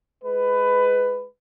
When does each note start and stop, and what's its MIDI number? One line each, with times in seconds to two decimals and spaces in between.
0.24 1.27 56
0.24 1.27 71